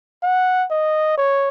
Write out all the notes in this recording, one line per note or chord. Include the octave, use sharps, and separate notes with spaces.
F#5
D#5
C#5